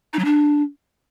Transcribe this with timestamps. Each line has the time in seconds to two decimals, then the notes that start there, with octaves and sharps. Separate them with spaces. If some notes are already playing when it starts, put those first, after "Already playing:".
0.13 D#4
0.19 F#3
0.25 D4